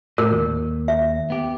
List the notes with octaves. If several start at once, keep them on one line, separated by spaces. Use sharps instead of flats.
A2 A#4
D#2
E5
B3 G4